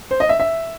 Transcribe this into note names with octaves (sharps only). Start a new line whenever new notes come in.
C5
D#5
E5
E5